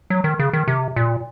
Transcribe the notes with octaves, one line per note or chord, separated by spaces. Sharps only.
F#3
D#3
C#3
D#3
C3
A#2